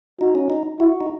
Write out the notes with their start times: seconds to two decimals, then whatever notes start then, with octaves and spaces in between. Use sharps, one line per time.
0.21 D#4 F#4
0.35 C#4
0.50 D#4
0.80 E4 F#4
1.01 D#4